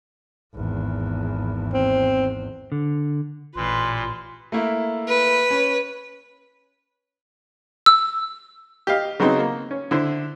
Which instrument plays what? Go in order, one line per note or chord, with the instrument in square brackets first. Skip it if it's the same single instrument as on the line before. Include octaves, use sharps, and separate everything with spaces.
[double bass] G#1 E2
[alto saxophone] C4
[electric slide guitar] D3
[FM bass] A1 [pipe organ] A#2 [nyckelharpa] B4 [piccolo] C6
[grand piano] A3 A#3 E4
[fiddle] B4
[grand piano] C#4
[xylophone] E6
[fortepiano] G4 D#5 F5
C#3 F#3 B3 C4 D#4
A#3
C#4
D3 E4 C5